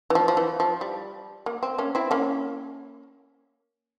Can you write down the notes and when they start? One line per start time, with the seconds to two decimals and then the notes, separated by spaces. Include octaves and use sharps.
0.10 E3
0.15 F3
0.28 F3
0.37 E3
0.60 F3
0.81 G3
1.46 A#3
1.63 C4
1.78 A#3 C#4
1.95 C4 E4
2.11 A#3 C#4